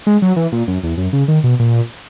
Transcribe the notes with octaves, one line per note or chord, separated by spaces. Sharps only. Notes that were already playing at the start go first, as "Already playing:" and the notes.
G#3
F#3
E3
A#2
F#2
E2
F#2
C#3
D#3
B2
A#2